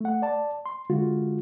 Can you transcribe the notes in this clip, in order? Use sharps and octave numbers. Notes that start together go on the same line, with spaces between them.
A3 F#5
D5 A5
C6
D3 G#3 F4 F#4